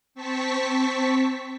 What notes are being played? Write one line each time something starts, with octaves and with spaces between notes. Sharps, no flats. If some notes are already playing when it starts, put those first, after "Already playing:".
C4 A5 C#6 B6